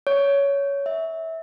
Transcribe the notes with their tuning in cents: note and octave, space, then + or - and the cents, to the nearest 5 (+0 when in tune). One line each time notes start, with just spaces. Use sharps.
C#5 +15
E5 -20